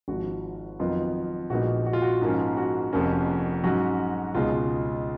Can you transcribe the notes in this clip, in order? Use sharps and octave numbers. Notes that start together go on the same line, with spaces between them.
G#1 G#2 F3 F#4
F2 D#3 F#3 B3 D#4 F4
A#1 A#2 G#3 B3 D#4 F#4
F#4
F4
F#4
G#2 F3 A#3 C#4
F#4
F1 F2 F3 A#3 C#4
G#2 F#3 C#4 F#4
C#2 B2 G#3 D#4 F4